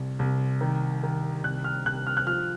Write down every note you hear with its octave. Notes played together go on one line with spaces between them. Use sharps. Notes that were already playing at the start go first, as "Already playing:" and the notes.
Already playing: C2
C2
D#3
D#3
C2 F#6
F6
C2 F#6
F6
F#6
F3 F6